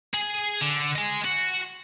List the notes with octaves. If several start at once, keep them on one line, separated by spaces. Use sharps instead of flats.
G#4
D3
D#5 G#5
F#4